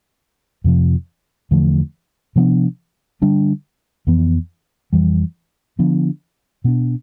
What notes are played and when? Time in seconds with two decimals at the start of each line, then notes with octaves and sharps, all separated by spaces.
0.64 F2 C3 F3
1.51 E2 D3 F3 A3
2.36 C3 F3 B3 D4
3.22 D3 G3 D4
4.07 F2 E3 B3
4.93 F2 E3 G3
5.79 D3 F3 B3 D4
6.64 B2 B3 D4